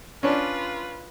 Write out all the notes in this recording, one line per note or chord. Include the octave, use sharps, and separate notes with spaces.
C#4 D4 F4 B4